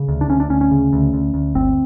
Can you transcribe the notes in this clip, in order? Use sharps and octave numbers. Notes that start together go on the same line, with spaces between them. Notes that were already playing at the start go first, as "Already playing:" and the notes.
Already playing: C#3
D2
D4
D2 C#4
D4
D2 C#4
C#4
C#3
D2
D2
D2
G1 C4